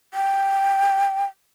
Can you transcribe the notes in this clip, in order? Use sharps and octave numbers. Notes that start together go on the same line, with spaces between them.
G5